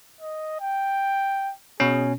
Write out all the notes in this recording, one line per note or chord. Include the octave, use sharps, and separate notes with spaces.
D#5
G5
B2 C#4 G#4